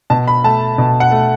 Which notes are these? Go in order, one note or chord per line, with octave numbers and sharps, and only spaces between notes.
B2 A5
B5
A3 A5
B2
F#5
A3